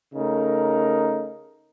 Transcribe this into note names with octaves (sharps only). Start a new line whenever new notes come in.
C#3 A3 D#4 A#4